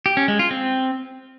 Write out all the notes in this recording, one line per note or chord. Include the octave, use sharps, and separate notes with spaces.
G4
C#4
G#3
F4
C4